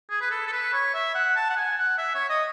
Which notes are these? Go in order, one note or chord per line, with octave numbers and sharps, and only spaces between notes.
G#4
B4
A4
A4
B4
C#5
E5
F#5
A5
F#5
G#5
F#5
E5
C#5
D#5